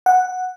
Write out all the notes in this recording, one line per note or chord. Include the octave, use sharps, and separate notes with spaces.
F#5